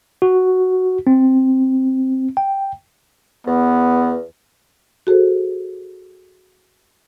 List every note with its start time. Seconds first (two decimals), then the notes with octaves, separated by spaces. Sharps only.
0.22 F#4
1.07 C4
2.37 G5
3.47 E2 B3
5.07 F#4 G#4 A4 C5